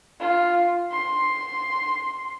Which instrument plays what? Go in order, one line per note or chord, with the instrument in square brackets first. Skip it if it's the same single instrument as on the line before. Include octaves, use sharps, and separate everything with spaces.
[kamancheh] F4
C6